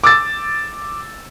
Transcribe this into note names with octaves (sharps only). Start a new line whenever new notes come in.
D6 E6 A6